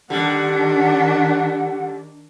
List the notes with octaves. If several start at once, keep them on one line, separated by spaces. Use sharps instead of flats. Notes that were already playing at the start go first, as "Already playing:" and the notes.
D3 D#3 G3 D4 F#5